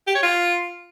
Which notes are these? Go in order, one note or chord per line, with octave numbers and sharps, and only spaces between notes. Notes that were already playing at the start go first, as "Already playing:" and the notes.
G4
C#5
F4